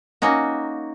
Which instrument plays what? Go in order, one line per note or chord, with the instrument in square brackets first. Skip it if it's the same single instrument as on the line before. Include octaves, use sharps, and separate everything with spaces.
[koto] A#3 C#4 D#4 F#4